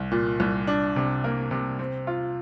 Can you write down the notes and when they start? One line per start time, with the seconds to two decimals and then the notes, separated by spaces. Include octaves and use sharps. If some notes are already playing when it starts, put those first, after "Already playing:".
Already playing: C2
0.11 A#2
0.40 C2
0.67 D4
0.96 C3
1.24 A#3
1.51 C3
1.79 C4
2.07 F4